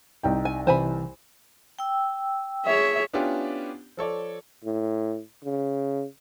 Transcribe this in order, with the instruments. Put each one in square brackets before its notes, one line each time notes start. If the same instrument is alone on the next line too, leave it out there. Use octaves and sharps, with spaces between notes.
[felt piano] C2 D#4 G5
[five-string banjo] G#5
[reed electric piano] C3 E3 [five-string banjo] C5 G#5 B5
[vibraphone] G5 E6
[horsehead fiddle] G#4 C#5 [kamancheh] E5
[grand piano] B3 C#4 D4 E4 F4 G4
F3 A4 C#5 D5
[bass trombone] A2
C#3